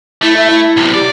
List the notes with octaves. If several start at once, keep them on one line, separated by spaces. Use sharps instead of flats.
A3 E4
E5
E4
B1 C3
G4 D5